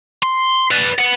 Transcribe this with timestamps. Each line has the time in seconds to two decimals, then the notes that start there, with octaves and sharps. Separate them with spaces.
0.23 C6
0.71 B4 D5
0.99 B4 F#5